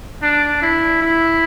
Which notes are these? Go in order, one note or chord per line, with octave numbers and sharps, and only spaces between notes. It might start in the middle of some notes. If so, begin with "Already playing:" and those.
D4
E4
E4